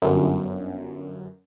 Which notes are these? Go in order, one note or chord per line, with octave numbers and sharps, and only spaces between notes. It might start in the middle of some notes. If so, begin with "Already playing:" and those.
G1 F#2